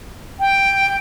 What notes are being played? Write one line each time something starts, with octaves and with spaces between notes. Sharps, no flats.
G5